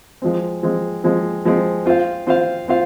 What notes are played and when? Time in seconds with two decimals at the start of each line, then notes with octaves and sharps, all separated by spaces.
0.22 F3 G#3 C4
0.63 F3 G#3 C4
1.04 F3 G#3 C4
1.45 F3 G#3 C4
1.86 C4 F4 C5 F5
2.27 C4 F4 C5 F5
2.68 C4 F4 C5 F5